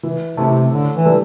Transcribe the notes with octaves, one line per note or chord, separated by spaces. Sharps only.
E3
C3 A3 E4 G4
A2 D3
E3
G3 D4 A4